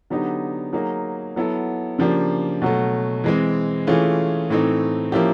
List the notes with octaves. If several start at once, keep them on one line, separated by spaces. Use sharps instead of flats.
D3 F#3 B3 D#4 G4
F#3 A#3 D#4 G#4
F#3 B3 E4 A4
C#3 F3 A#3 D4 G4
B2 F#3 A3
E3 G#3 C4
E3 A3 C#4 F4 G#4
A2 E3 A3 C4 D#4
F3 A#3 C#4 E4 G4